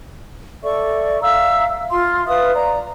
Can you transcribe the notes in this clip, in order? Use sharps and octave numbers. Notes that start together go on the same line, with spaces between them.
A4 D5 E5 C#6
E5 F5 A#5 E6
F4 C6
B4 E5 F5 D#6
D5 A#5